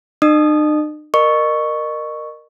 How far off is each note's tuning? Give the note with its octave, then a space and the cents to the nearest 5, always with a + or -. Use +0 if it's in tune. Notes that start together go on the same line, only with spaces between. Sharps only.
D#4 -45 D#5 -45 D#6 -15
A#4 +0 D#5 -35 C#6 +0